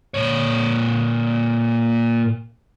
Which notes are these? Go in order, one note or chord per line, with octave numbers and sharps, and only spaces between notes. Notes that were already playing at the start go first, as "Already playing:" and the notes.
A#2 C#5